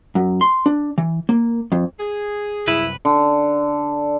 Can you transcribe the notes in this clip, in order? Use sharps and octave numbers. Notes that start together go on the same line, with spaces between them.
F#2
C6
D4
E3
A#3
F2
G#4
C2 F#2 E4 B4
D3